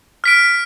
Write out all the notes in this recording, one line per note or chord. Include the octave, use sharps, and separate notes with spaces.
F6 B6 D7